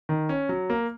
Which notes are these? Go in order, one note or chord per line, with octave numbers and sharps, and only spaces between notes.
D#3
C#4
F#3
A#3